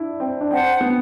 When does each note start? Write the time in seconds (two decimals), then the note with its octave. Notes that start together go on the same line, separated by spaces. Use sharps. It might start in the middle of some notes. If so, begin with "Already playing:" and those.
Already playing: D4 E4
0.20 C4
0.41 D4
0.50 C4 C5 F#5 A5
0.81 B3